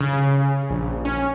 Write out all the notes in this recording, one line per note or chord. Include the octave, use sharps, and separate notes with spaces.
C#3
A#1
C#4